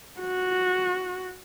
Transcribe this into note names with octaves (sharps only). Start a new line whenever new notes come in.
F#4